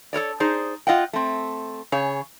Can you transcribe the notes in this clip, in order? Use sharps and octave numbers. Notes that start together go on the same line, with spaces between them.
A4 A#4 C#5 D5
D#4 G#4 C5 D5
F4 D#5 F#5 G5
A3 C4
C#3 G#4 C#5